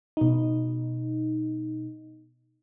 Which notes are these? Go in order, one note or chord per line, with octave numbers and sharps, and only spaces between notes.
B2 D#4